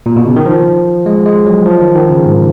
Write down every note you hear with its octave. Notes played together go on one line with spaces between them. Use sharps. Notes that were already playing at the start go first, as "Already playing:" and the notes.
A#2
B2
C#3
D#3
F3
G#3
G#3
F#3
F3
D#3
D#3
C#3
G#2